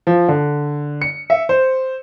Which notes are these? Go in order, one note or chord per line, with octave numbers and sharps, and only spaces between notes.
F3
D3
C#7
E5
C5